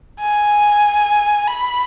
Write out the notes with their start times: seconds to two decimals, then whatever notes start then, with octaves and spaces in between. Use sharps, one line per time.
0.21 G#5
1.48 B5